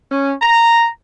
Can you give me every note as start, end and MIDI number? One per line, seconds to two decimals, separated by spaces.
0.11 0.31 61
0.41 0.86 82